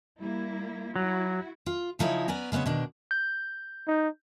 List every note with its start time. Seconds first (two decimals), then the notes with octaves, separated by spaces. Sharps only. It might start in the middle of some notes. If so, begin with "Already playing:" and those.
0.20 G3 A#3 E4
0.96 F#3 E4 F#4
1.66 F4
1.99 C#3 F3 D#4 E4 C#5
2.28 B3 C#4 D5 G#5 A#5
2.52 C#3 G#3 B3 C4 C#5
2.66 B2 D#3 D4
3.11 G6
3.87 D#4